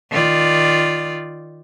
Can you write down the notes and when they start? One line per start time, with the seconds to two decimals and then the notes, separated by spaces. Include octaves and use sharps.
0.11 D#3 F4 D5